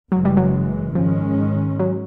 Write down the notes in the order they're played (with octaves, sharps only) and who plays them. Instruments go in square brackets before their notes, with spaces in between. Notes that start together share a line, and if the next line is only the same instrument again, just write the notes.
[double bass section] F#1 F#2 C#3 E3 G#3 [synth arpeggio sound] F#3
[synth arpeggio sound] G3
F#3
[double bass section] G#2 D#3 G#3 C#4 [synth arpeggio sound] F3
[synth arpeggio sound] F#3